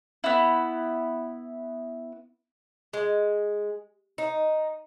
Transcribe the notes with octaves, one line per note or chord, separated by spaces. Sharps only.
B3 E4
G#3
D#4